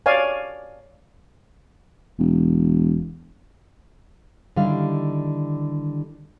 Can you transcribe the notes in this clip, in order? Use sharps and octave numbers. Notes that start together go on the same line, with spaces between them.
C#5 D5 F5 G#5
E1
D3 D#3 G3 E4 G4 F5